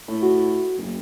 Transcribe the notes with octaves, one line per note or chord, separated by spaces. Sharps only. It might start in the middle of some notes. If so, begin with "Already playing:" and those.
A2
F#4
F#1